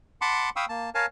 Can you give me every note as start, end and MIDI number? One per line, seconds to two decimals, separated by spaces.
0.21 0.50 78
0.21 0.50 81
0.21 0.50 83
0.21 0.50 84
0.21 0.50 86
0.56 0.65 77
0.56 0.65 79
0.56 0.65 83
0.56 0.65 85
0.56 0.65 87
0.56 0.65 88
0.69 0.90 58
0.69 0.90 81
0.95 1.06 70
0.95 1.06 73
0.95 1.06 77
0.95 1.06 80
0.95 1.06 81